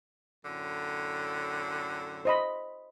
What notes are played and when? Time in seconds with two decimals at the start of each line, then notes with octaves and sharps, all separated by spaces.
0.45 F#2 A2 D3
2.25 C5 D#5 B5